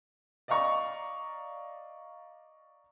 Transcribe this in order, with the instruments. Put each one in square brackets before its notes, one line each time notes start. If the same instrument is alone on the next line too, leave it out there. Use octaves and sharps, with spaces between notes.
[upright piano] D5 D#5 F5 A#5 C#6